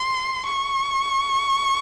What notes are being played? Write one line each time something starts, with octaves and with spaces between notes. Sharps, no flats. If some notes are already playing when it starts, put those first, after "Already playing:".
Already playing: C6
C#6